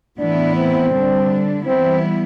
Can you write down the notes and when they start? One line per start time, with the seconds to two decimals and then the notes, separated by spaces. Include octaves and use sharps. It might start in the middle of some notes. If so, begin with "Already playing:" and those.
0.19 A2 E3 B3 D4 E4
0.56 C4
0.93 D3 G3 D4
1.67 E3 G3 B3 C4 E4